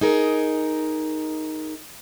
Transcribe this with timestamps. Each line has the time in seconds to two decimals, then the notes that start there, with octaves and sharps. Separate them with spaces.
0.01 D#4 G#4 A#4